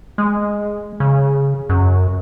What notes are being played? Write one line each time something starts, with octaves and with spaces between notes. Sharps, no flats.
G#3
C#3
F#2